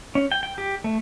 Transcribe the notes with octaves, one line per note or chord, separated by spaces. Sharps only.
C#4
G5
G5
G4
A3